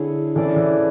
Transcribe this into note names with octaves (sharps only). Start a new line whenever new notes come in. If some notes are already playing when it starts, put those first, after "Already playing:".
Already playing: D3 E4 G#4 C#5
E3 A3 C#4 G#4 D5
E3